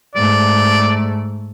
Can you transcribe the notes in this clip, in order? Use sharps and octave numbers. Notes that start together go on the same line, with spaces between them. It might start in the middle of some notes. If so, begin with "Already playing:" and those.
G#2 A3 D5